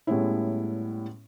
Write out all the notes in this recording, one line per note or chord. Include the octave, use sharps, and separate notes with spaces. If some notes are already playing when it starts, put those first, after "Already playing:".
A2 G3 G#3 B3 C#4 E4